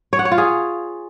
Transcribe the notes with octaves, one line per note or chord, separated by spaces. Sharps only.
C#5
F#5
C#5
F4
G#4